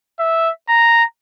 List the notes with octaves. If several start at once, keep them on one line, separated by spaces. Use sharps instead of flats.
E5
A#5